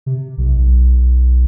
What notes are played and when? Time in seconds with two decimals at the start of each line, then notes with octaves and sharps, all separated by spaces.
0.06 C3
0.38 B1
0.57 B1